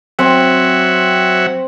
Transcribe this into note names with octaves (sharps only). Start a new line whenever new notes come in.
F#3 C4 E5 F#5